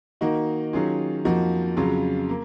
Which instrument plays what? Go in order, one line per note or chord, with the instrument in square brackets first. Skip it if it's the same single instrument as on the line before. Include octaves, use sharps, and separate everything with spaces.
[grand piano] D#3 A#3 D#4 F#4
D#3 F#3 C#4 F4 G#4
F2 F3 A#3 D#4 F#4
F2 C#3 F#3 C#4 F4
A#3